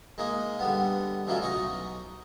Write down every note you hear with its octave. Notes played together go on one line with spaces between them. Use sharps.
G#3 A#3 D#4
D3 G3 B3
C#3 E3 F#3 G#3 A3 F4
B1 D#4 A#5 C#6